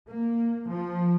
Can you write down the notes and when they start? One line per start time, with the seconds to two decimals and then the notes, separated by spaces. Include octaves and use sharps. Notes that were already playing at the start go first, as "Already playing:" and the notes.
0.09 A#3
0.67 F3